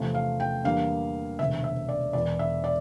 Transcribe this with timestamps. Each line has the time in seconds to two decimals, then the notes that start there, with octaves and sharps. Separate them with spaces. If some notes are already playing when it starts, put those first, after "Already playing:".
Already playing: E2 C3 F3 A3
0.15 F5
0.40 G5
0.64 E2 D3 G3 A#3 F5
1.39 E1 D2 C3 E5
1.64 E5
1.89 D5
2.13 E1 E2 E3 D5
2.39 E5
2.64 D5